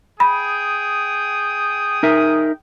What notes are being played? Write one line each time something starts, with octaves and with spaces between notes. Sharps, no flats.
G#4 G5 B5 D#6
D#4 A#4 E5